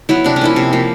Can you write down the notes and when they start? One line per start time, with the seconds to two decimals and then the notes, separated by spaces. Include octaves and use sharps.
0.09 F#3 B3 E4
0.24 C3 D4
0.36 C#4
0.41 F3 A#3 E4
0.56 C3
0.73 F3 A#3